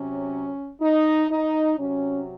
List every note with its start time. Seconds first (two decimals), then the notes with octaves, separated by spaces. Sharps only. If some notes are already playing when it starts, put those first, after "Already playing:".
Already playing: C3 F#3 C#4
0.82 D#4
1.31 D#4
1.79 C3 F#3 C#4